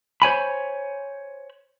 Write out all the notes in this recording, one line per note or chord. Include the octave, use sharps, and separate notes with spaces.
C5 C#5 G#5 B5